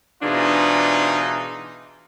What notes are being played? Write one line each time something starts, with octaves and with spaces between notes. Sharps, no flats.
G#2 B2 E3 D4 D#4 F4